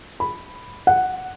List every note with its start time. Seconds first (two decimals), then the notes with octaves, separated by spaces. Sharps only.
0.20 B5
0.87 F#5